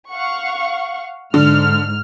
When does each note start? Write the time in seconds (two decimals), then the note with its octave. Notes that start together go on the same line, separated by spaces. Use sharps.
0.11 F5 F#5 C#6
1.34 G#2 D3 F6